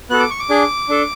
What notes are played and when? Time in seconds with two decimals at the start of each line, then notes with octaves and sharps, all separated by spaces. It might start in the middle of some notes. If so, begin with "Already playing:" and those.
0.10 B3 F#4 A4 F#6
0.20 D6
0.31 C#6
0.39 D6
0.50 D4 G#4
0.89 D4 A4